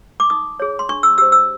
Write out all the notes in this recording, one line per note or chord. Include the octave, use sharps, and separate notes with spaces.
D6
D#4 D#6
G#4 C#5
C6
D4 C#6
E6
G4 C5 E6
E6